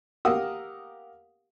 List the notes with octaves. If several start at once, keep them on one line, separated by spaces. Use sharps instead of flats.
G4 A#4 F5 F#5 D#6 E6